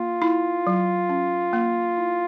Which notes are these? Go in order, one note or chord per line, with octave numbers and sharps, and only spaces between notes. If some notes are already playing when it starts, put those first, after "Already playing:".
Already playing: A#3 F4
E4
F#3
C#4
A#3
E4